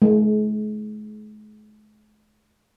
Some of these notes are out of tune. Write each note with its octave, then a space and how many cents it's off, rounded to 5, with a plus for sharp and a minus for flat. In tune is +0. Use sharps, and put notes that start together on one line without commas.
G#3 +45